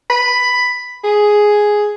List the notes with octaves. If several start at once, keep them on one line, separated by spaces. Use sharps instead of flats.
B5
G#4